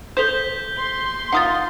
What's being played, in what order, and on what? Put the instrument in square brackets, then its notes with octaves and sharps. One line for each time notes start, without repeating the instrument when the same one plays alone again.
[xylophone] A4 E7 [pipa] C5 [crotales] G6 B6 G7
[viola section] C6
[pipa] D#4 F4 A#4 [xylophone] F#5 D#6 A6